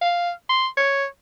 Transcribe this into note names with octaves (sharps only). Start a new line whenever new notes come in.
F5
C6
C#5